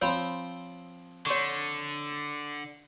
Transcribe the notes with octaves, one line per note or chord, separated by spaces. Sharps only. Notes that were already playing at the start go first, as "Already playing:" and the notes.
F3 C4 C#5 B5 C6
D3 C#5 C6 C#6